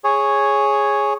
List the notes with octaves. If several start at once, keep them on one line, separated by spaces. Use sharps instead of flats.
G#4 C#5